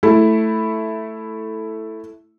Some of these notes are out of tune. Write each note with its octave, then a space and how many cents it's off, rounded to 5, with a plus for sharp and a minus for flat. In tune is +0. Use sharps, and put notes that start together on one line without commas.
A3 +0 E4 +0